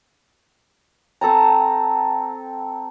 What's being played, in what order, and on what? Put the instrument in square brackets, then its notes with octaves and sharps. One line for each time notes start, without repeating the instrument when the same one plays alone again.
[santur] C4 A4 A5 A#5